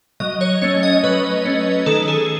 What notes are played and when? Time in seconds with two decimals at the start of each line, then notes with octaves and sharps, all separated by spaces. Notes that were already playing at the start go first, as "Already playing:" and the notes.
0.20 F#3 D#5
0.41 C#5
0.62 A3 C#4 C#5
0.83 D#5
1.04 F#3 B4
1.45 A3 C#4
1.86 D#3 A4
2.08 G#4